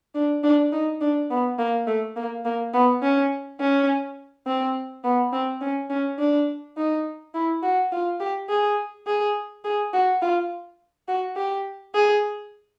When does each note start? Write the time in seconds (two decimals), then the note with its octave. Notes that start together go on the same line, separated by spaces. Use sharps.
0.15 D4
0.43 D4
0.72 D#4
1.01 D4
1.30 B3
1.59 A#3
1.87 A3
2.16 A#3
2.45 A#3
2.74 B3
3.02 C#4
3.60 C#4
4.47 C4
5.04 B3
5.33 C4
5.61 C#4
5.90 C#4
6.19 D4
6.77 D#4
7.34 E4
7.63 F#4
7.92 F4
8.20 G4
8.49 G#4
9.07 G#4
9.64 G#4
9.93 F#4
10.22 F4
11.08 F#4
11.36 G4
11.95 G#4